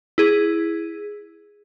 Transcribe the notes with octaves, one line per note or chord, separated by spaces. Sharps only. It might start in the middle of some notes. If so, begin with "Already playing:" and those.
E4 G#4